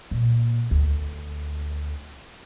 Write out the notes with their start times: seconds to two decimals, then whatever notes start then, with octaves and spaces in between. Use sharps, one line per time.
0.11 A#2
0.71 D2